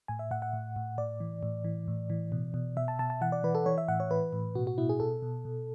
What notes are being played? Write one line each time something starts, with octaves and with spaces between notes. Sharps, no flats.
A2 G#5
E5
A2 F#5
F#5
A2
A2
A2 D5
E3
A2
E3
A2
E3
B2
B2
B2 E5
A5
B2 A5
A5
E3 F#5
D5
E3 B4
A4
E3 C#5
E5
A2 F#5
C#5
E3 B4
A2
B2 F#4
F#4
B2 E4
G#4
B2 A4
B2
B2